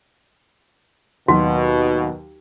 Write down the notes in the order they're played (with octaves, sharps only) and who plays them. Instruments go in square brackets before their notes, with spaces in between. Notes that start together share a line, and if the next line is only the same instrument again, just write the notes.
[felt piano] D#2 F#3 [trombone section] B2 [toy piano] F#4